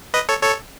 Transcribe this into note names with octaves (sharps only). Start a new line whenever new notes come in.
B4 D#5
A4 C#5
A4 C#5